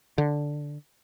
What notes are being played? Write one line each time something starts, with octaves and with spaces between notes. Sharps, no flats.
D3